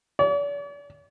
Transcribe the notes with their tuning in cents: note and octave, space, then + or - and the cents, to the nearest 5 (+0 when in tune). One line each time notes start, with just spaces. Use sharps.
D5 -45